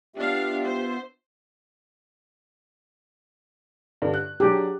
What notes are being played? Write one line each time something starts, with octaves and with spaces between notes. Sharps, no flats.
B3 D4 F4 G4 E5 F5
C5
G2 D3
F#6
F#3 D4 G4 G#4